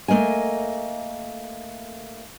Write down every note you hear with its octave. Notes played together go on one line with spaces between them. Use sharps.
A3 A#3 D#5 G#5